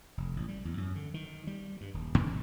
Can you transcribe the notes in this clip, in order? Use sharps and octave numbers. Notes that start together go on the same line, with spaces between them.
F1
A1
G3
E2
F#2
D3
D#3
G3
G2
D#1
E2